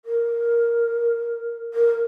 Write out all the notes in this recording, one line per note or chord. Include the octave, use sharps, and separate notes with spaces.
A#4
A#4